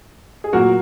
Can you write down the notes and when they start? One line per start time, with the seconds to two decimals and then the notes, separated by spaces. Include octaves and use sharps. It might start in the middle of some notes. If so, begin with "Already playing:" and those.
0.44 G#4
0.53 A#2 F#3 A#3 F#4 A#4